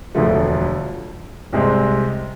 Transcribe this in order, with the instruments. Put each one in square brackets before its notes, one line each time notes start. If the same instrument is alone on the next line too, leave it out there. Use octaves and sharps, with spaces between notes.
[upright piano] E1 D2 D3 F3 A3
C2 C3 G#3 C4